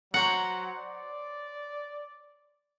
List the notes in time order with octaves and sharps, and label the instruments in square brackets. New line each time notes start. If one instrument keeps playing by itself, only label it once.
[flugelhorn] F#3 [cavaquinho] C5 C#5 A#5 [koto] F#5
[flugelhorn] D5